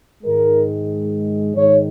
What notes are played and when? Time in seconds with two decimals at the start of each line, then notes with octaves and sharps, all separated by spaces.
0.22 G#2 D#3 G#3 A#4
1.54 G#2 D#3 G#3 C#5